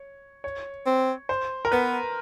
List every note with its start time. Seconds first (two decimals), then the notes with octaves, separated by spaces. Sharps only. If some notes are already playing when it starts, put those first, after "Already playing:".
Already playing: C#5
0.44 C#5
0.86 C4
1.29 C5
1.65 A#4
1.72 B3 B4